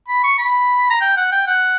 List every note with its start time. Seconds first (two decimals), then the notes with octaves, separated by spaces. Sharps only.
0.08 B5
0.23 C#6
0.38 B5
0.90 A#5
1.00 G5
1.17 F#5
1.31 G5
1.47 F#5